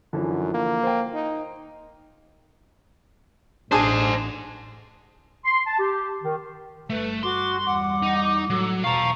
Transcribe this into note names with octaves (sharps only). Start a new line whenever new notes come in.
F#2 D3 E3 F3
A#3
C5 G5
D#4
A1 D4 G#4 C5 G#5
C6
A5
G4
D#3
G1 A3 B4
F#4 C6 D6
E2 G3 F#5 D6
D#4
A2 F#3 A4
E2 B2 F5 A5 A#5 C#6